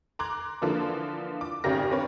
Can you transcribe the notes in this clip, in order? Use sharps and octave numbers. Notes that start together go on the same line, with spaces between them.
A#5 C6 D6 F#6 G#6
D3 E3 F3 A#3 A4
D6
G#1 C#3 C4 G4 A#4 A#6
C4 D4 A#4 B4 C#5